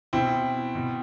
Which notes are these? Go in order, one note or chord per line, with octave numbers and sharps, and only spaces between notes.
B2 C4 E4
B2